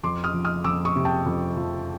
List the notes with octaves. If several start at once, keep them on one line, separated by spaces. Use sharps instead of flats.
F2 C6 D6
D#6 F6
F3
D#6 F6
F2 D6 E6
C#6 D#6
C3
G5 A5
F2
F3